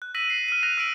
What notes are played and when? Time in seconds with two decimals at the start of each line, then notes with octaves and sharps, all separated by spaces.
0.02 F#6
0.15 E6 A#6 B6 D#7 F#7
0.30 C7
0.48 F6 D#7
0.63 F6 F#6 A#6 F7
0.77 E6 B6 D7 F#7